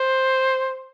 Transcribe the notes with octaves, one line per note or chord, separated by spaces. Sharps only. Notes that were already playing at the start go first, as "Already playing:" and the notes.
Already playing: C5